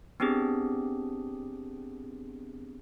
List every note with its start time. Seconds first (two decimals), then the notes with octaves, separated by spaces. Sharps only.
0.20 B3 C4 D4 G4 G#4